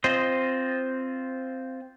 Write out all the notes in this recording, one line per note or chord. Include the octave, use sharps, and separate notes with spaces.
C4 F4 C5 D#5